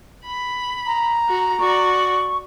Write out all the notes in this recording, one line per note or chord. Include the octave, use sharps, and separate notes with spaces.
B5
A#5
F#4
F#4 D5 C#6